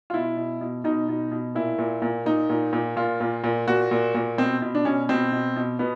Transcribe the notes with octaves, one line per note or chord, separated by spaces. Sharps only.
F4
B2 E4
B2
B2
B2 D#4
B2
B2
A#2 E4
A#2
A#2
A#2 D#4
A#2
A#2
A#2 F4
A#2
A#2
A#2 F#4
A#2
A#2
B2 C4
B2
D4
B2 C#4
B2 C4
B2
B2
B2 B3